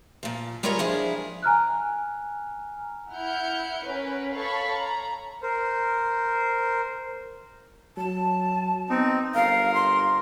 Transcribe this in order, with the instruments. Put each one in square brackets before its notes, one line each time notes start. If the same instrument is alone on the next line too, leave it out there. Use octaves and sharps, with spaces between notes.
[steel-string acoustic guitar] A#2 F3
G3 G#3 F4 G#4 A#4 C#5
F3 D4 E4 G#4
[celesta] G#5 A#5 F6 F#6
[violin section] E4 F#5 F6 G6 C#7
C#4 A#4 B4
A4 C#5 F5 A5 B5 C#6
A#5
[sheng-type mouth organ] A#4 C5
[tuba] F#3 [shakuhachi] A5
[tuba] B3 [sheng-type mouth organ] C4 D#4
[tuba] G1 [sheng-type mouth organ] A#4 [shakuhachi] F5
[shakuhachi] C6